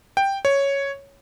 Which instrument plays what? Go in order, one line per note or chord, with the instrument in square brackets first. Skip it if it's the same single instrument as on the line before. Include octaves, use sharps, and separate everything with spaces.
[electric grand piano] G5
C#5